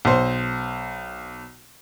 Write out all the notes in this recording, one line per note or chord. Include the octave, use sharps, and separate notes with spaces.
B1 C5